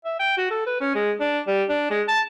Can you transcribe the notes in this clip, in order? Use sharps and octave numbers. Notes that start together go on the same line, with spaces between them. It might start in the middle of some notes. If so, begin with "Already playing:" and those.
E5
G5
F#4
A4
B4
C#4
G#3
D4
G3
D4
G#3
A5